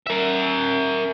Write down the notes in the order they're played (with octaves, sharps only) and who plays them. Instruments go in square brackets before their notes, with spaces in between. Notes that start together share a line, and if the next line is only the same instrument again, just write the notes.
[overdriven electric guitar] A#4 E5